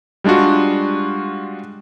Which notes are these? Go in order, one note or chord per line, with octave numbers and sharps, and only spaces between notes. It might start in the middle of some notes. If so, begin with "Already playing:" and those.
G3 G#3 D4 F4 F#4